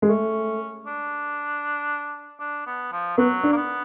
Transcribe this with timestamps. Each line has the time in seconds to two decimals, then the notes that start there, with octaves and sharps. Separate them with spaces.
0.02 G#3
0.09 A3 C#4
0.87 D4
2.40 D4
2.67 B3
2.92 F3
3.17 F#3 B3
3.43 D4
3.52 A#3
3.57 B3